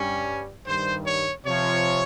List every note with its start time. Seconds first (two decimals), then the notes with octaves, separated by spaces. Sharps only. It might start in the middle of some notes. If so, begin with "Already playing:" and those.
Already playing: G2 G3 C#4
0.67 G2 D#3 G3 C5
1.07 C#5
1.45 C3 F3 C#5